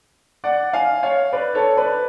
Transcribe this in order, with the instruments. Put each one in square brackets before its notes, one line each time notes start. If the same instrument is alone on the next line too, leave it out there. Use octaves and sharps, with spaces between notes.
[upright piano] D5 F#5
F5 G#5
C#5 F5
B4 D5
A4 C#5
B4 D5